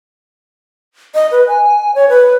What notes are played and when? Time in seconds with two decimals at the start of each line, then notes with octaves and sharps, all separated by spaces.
1.15 D#5
1.32 B4
1.48 G#5
1.95 C#5
2.09 B4